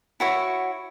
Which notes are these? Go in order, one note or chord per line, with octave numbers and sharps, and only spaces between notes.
E4 F#4 C#5